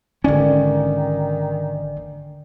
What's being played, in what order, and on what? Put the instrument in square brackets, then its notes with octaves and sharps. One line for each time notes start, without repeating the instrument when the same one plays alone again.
[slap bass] G#1 C#4 [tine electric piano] D3 D5 G#5 [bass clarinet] D#3